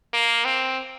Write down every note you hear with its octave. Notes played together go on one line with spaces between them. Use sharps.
A#3
C4